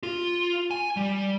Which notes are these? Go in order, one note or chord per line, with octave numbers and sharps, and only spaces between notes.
F4
G#5
G3